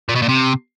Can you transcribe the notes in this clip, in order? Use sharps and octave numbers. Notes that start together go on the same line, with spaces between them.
A#2
B2
A#2
C3